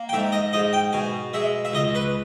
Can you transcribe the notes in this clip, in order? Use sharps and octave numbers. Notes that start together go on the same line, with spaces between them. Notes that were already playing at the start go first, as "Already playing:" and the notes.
Already playing: A#3
G5
G#2 E5
D#5
G#2 D#5
G5
B2 G#5
G#3 E5
E5
C#2 D#5
B4